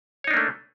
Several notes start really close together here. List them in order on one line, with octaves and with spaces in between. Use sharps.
C#5 D#4 D4 A#3 A3